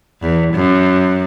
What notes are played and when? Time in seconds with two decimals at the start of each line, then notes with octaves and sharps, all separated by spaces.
0.21 E2
0.54 F#2